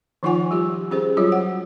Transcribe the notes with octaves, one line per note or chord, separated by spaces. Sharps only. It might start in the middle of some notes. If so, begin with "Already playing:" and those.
D#3 F3 D#4 F4 F#5 G#5
G3 F4 G4
C#4 G4 G#4 C5
F#3 G3 F4 F#4 C#5
F#5